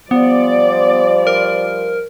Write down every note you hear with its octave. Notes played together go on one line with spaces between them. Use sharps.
F3 G3 B3 C5 D5
A#4